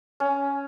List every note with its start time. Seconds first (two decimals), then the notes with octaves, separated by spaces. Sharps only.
0.20 C#4